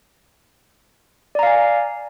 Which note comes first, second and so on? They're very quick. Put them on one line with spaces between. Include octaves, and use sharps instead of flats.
D5 A#5 F5 G#5